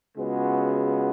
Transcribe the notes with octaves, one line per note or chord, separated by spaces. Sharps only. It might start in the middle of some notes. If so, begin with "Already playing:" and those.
C#2 C#3 G#3 B3 F#4